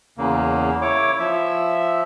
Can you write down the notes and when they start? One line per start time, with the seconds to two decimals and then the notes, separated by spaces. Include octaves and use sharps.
0.18 E2 C#3 A#3
0.82 E4 C#5 D6
1.19 F3 E5